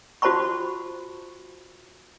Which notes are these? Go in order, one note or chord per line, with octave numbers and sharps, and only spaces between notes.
F4 F#4 C5 A5 B5 C#6